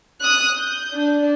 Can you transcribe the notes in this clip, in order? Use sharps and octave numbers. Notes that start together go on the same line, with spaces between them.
D#6 F#6
G6
D4